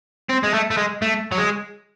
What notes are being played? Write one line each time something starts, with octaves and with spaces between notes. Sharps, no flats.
C4
G#3
A3
A3
G#3
A3
F#3
G#3